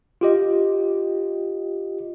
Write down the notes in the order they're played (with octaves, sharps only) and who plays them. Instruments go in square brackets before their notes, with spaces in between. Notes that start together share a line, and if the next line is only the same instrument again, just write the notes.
[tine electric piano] F4 G4 D#5